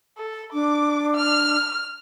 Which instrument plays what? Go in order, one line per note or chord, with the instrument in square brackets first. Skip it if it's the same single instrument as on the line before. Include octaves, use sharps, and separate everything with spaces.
[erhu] A4
[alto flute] D4 [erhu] D6
[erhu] F6